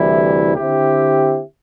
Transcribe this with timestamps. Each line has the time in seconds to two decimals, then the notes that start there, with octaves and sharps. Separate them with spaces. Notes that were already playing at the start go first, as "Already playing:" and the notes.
Already playing: D2 C3 E3 G3 E4
0.56 D3 C4 E4 G4